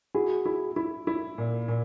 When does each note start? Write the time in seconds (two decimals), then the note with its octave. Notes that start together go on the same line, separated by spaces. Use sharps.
0.15 E4 F#4 G#4
0.46 E4
0.76 E4
1.07 E4
1.38 A#2
1.68 A#2